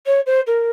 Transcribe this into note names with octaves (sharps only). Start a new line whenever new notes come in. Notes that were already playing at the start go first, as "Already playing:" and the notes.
C#5
C5
A#4